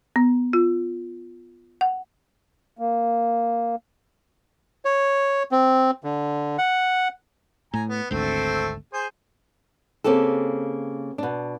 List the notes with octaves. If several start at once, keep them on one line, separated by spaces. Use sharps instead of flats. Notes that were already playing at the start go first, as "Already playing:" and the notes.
B3
F4
F#5
A#3
C#5
C4
D3
F#5
A2 G#5 A#5
B3
G#1 D2 A3 C4 A4
G#4 C5
C#3 A#3 C4 G4 A4
B2 D4